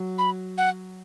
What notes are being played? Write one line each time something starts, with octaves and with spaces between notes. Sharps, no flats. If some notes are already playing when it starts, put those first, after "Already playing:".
Already playing: F#3
B5
F#5